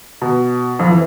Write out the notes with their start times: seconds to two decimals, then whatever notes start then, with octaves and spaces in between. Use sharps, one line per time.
0.22 B2
0.79 F2 F3
0.90 E3